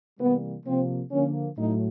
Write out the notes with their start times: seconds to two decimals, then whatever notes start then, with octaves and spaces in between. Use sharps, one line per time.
0.19 C3 E3 G3 A#3 B3
0.65 C3 F3 A#3 C4
1.11 D3 F3 A#3 C#4
1.58 A2 F#3 A3 D#4